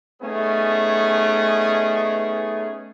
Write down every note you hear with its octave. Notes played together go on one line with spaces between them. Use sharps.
A3 B3 C#4 D#4 G#4